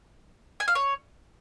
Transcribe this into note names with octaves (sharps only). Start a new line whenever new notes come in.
G#5
F5
C#5